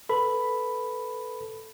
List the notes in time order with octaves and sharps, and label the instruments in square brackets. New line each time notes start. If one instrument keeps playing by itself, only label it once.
[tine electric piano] A4 B4 B5